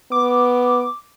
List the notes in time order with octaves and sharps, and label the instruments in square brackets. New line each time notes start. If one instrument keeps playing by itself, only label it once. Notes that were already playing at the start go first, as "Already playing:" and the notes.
[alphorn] B3 [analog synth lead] D6